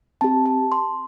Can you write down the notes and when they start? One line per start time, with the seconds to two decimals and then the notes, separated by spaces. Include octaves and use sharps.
0.21 C4 G4 A5
0.46 A5
0.72 C6